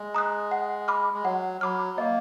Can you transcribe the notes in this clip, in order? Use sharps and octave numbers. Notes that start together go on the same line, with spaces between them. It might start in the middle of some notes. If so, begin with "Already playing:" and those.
Already playing: G#3
A#5 D#6 F#6
F#5
B5 D6 F6
G#3
F#3 F#5
F#3 B5 D6 F6
A#3 D#5